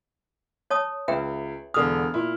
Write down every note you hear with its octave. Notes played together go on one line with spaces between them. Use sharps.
C#5 A5 D#6
C#2 B4 E5 G5
E1 D3 D#6 F6
A#2 E4